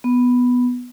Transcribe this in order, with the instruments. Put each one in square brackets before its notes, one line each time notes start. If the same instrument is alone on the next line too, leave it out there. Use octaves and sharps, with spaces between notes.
[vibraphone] B3